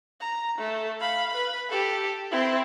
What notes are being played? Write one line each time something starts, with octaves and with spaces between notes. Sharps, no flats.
A#5
A3
F5 B5
B4 B5
G4 A4
C4 E4